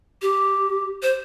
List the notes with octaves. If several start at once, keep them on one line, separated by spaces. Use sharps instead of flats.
G4
C5